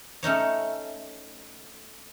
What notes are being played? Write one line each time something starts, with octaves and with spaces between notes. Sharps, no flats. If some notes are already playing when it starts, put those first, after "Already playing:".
A3 C#4 D#4 C#5